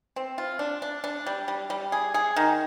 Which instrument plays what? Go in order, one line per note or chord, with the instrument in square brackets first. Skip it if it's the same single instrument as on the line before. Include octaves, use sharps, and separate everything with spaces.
[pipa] C4
F4
D4
D4
D4
G3
G3
G3
G#4
G#4
D#3